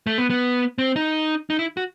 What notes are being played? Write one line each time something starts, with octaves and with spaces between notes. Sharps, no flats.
A3
B3
B3
C4
D#4
D#4
E4
F#4